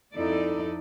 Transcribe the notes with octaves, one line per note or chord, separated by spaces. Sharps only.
F2 D#4 E4 A4 D5